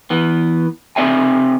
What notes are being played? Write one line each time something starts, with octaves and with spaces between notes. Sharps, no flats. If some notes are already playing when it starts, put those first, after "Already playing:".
E3 B3
C3 A3 C4 D5 E5 G#5